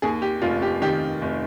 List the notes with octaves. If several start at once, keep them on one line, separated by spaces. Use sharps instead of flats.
D#2 G#4
G4
F1 F4
G4
D#3 G4
F1